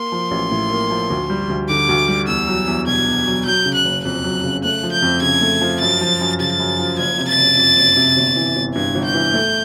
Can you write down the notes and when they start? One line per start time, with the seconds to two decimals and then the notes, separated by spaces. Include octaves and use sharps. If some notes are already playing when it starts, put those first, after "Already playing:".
Already playing: A#3 C6
0.12 F3
0.31 A1
0.51 A2
0.71 A#3
0.91 F3
1.10 D2
1.30 G3
1.50 D2
1.68 D3 D6
1.89 D2
2.08 G3
2.28 E2 E6
2.48 F#3
2.67 E2
2.87 B2 G#6
3.07 E2
3.26 F#3
3.46 F#3 G6
3.66 C#3
3.74 F#6
3.85 F#1
4.04 F2 F#6
4.24 F#3
4.44 C#3
4.64 A3 F#6
4.83 F3
4.92 G6
5.02 F2
5.22 C#3 G#6
5.41 A3
5.61 F3
5.81 F#2 A6
6.01 F3
6.20 F#2
6.40 C#3 A6
6.60 F#2
6.79 F3
6.99 F#1 G#6
7.18 C3
7.29 A6
7.38 F#1
7.57 F2
7.77 F#1
7.97 C3
8.17 G1
8.36 E3
8.56 G1
8.75 G2 G#6
8.95 G1
9.05 G6
9.14 E3
9.34 A3